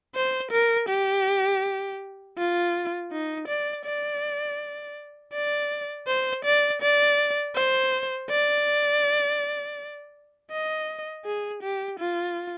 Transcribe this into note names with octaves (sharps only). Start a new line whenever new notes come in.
C5
A#4
G4
F4
D#4
D5
D5
D5
C5
D5
D5
C5
D5
D#5
G#4
G4
F4